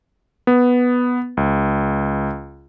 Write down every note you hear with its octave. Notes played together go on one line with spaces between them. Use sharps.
B3
C#2